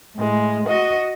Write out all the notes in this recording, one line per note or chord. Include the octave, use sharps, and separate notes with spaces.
A2 G#3
F#4 D#5